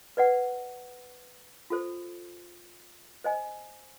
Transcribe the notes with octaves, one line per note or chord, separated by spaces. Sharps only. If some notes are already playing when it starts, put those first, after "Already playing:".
B4 D5 F#5
F4 A4 C5
C5 D#5 G#5